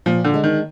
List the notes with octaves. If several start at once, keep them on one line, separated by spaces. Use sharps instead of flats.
A#2 F3
D3
G#3 D4
D#3